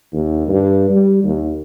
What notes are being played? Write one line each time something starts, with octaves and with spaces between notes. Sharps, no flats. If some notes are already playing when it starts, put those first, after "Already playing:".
D#2
G2
G3
D#2